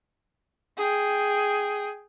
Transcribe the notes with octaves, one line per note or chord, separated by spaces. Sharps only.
G#4 G5